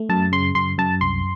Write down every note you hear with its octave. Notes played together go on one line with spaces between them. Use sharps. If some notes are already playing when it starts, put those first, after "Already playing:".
Already playing: A3
F#2 A5
C#3 C6
F#2 C6
F#2 A5
C2 C6